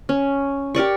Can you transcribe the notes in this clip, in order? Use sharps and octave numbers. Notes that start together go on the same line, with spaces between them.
C#4
G4 A#4 D5 C#6